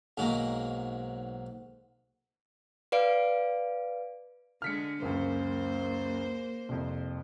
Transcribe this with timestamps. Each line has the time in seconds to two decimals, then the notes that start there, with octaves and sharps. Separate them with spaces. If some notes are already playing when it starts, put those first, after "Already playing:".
0.17 B1 G#2 F#3 A#3
2.92 B4 D5 F5 D7
4.62 D3 G#3 F6 B6 C#7
5.02 C#2 F#2 A#3 C5
6.69 C2 F2